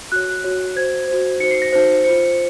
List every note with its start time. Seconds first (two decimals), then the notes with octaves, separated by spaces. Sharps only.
0.12 F#4 C#5 F#6
0.44 F#4 C#5
0.76 F#4 C5 G#6
1.08 F#4 C5
1.40 D#4 F#4 C5 C#7
1.51 C7
1.62 A#6
1.73 D#4 F#4 C5
2.04 F4 C5 C#7